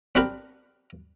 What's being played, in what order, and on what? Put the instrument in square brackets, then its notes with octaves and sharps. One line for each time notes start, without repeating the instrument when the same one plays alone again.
[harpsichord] C4 D4 F#4 G4 A#4 B4